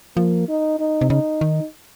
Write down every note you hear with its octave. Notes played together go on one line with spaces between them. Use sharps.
F3 A#3
D#4
D#4
C3
C#3 D#4
D#3